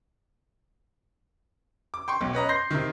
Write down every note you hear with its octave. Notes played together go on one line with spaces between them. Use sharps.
D6
G5 C6 C#6
B1
C#4 B4 D#5 A#5
C6 G6 A#6 C7
C3 D#3